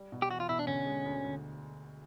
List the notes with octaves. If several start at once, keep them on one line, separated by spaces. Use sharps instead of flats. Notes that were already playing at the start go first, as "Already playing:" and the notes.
Already playing: G3
B2
G4
E2 F#4
F4
B2 E4
D4
D3 C#4
G#3
D2
D2